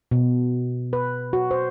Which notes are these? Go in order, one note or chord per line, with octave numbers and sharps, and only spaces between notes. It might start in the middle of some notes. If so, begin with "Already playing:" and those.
B2
B4
F#4
C5